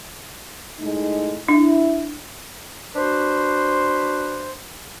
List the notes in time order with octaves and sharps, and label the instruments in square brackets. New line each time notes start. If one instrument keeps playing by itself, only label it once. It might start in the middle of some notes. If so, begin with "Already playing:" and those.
[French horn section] A2 G#3 D#4
[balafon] D4 [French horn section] E4
[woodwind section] D4 F#4 B4 C5